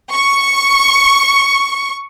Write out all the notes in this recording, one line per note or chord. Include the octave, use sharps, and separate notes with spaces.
C#6